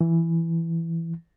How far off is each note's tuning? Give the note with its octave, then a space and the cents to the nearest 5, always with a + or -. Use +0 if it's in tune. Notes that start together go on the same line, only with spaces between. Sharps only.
E3 +10